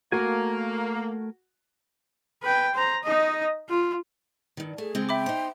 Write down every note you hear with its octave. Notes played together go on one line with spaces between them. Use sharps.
A3 A#3 F#4 A#4 G#5
B4 G5
C5 A#5
D#4 D#5
F4
G2 D#3
A3 G#4
C#3 G#3 C4
E5 G5 B5 D6
D#4 C5